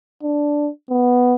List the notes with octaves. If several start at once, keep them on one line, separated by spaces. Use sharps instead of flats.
D4
B3